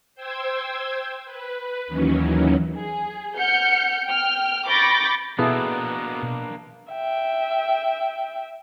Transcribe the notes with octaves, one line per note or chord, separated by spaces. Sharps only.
C5 G5 E6 G#6
B4
D#2 D#3 E3 F#3 C#4
G#4
F#5 F6 G6 C#7
G5 F6
B5 C#6 D6 G6 A6 A#6
B2 A#3 B3 D4 E4 G#4 A4
E5 G5